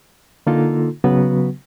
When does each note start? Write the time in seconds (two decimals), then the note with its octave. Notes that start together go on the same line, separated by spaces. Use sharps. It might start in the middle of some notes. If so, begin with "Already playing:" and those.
0.47 D3 A#3 D#4 F4 A4
1.04 C#3 F#3 B3 F#4 B4